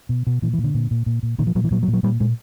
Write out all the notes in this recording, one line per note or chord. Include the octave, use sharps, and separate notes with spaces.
B2
B2
A#2 E3
E3
A#2
D3
A#2
A#2
A#2
A#2
A#2 D#3
F3
A#2 F#3
E3
A#2 F#3
F#3
A#2
F#3
A#2 G3
A#2 G#3